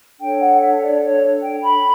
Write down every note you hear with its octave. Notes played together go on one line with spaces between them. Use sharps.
D4 A4 C#5 G5
F#5
E5
D5
C#5
G5
B5